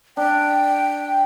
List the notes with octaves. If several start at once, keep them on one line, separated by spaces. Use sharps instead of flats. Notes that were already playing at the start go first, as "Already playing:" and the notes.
D4 G5